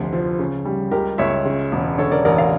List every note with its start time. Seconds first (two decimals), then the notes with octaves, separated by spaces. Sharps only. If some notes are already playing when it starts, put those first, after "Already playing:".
Already playing: F1 D2
0.13 F3
0.39 C#3
0.65 G3
0.91 C#2 G4 A#4
1.18 C#2 C#5 E5
1.45 C#3
1.72 E1
1.98 D3 A4 C#5
2.12 A#4 D5
2.25 A1 A#4 D5
2.38 D5 F5